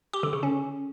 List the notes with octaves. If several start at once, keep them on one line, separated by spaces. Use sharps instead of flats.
G4
D3
C#3
C#4